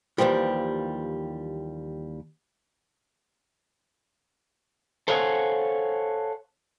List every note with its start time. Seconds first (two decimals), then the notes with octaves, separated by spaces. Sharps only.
0.18 D#2 A2 E3 F3 G3
5.08 A4 C5 C#5 F5 F#5 G#5